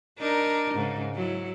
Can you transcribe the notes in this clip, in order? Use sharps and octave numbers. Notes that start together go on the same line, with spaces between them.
D4 D#4 A#4
G#2 C#3
F#3 E4